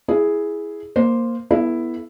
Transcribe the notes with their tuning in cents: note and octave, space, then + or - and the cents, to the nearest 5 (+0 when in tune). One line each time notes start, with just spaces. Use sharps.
E4 +0 G#4 +0
A#3 +0 C5 +0
B3 -10 E4 +0 A4 -40